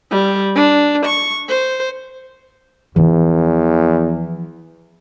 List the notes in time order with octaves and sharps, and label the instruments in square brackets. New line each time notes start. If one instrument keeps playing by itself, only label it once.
[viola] G3
D4
C#6
C5
[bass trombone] E2 [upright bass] E3 F3